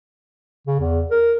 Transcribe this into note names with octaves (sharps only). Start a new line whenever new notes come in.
C#3
E2
A#4